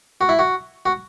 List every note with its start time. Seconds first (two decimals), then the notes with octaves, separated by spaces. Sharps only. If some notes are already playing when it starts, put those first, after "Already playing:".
0.21 F#4
0.29 E4
0.39 F#4
0.86 F#4